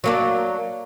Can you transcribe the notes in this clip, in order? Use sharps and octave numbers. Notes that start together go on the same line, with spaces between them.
F#3 A#3 D4